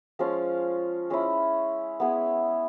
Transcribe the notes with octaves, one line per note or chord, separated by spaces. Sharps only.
F3 G#3 C#4 F4
G#3 C#4 E4
B3 E4 G#4 B4